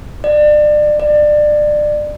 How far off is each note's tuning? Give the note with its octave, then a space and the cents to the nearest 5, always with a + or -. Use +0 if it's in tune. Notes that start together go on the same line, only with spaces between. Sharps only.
D5 +30
D5 +25